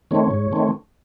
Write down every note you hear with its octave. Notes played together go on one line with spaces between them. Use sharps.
D#3 A3 C4 C#5
G#2
D#3 A3 C4